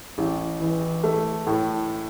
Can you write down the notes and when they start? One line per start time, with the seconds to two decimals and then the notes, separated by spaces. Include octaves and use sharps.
0.18 A1
0.60 E3
1.04 A3
1.47 A2